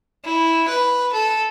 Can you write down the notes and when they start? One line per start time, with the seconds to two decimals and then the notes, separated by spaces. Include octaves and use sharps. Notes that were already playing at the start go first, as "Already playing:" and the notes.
0.25 E4
0.68 B4
1.13 A4